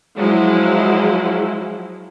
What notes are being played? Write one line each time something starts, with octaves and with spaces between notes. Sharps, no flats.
F3 F#3 G#3 E4